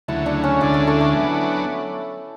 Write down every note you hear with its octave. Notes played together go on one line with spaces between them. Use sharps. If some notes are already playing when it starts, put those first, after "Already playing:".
D2 C#3 F#3 A3 E4
D4
C#4
D2 D3 G#3 D4 E4 A4
A3
A3
A3
F#3 B3 D4